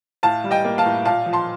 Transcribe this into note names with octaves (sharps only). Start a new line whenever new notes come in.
A2 F5 A5
G3
D#5 G5
A#3
F5 A5
A2
A#2 F5 A5
F3
A5 C6